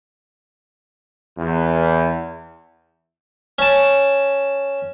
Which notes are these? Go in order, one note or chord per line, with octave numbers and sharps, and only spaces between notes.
E2
C#4 A5